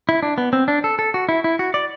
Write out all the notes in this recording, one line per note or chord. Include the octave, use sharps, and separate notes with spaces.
E4
D4
B3
C4
D4
A4
A4
F#4
E4
E4
F#4
D5